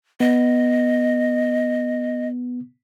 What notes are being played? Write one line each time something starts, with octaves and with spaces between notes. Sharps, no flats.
B3 D#5